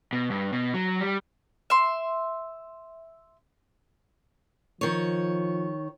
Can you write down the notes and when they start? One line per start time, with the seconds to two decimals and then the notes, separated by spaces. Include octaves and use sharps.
0.13 B2
0.30 G2
0.52 B2
0.74 F#3
1.00 G3
1.70 E5 C6
4.81 D#3 F3 C#5